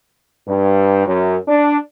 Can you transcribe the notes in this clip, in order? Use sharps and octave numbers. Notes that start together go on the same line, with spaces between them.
G2
F#2
D4